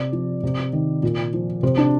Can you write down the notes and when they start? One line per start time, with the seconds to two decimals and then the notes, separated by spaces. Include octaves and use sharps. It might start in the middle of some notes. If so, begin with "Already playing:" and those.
Already playing: C3 D5
0.13 F3
0.43 C3
0.73 D#3
1.03 A#2
1.33 F3
1.63 C3 C5
1.77 D4